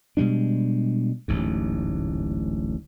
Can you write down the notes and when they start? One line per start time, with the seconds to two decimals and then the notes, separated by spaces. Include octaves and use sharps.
0.17 B2 G3 G#3 D4
1.28 D1 A1 G#2